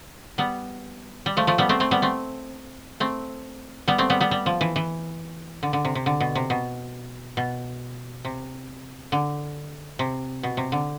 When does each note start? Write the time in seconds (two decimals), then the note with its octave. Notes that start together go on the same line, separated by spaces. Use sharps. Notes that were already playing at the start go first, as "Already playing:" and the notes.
0.38 G3 B3
1.26 G3
1.37 F3 A3
1.47 F3 A3
1.58 G3 B3
1.69 A3 C4
1.80 A3 C4
1.91 G3 B3
2.02 A3 C4
3.00 A3 C4
3.88 G3 B3
3.98 A3 C4
4.10 G3 B3
4.20 G3 B3
4.31 G3
4.46 F3
4.61 E3
4.76 E3
5.63 D3
5.73 D3
5.85 C3
5.95 C3
6.06 D3
6.20 B2
6.35 C3
6.50 B2
7.37 B2
8.25 C3
9.12 D3
9.99 C3
10.43 B2
10.57 C3
10.72 D3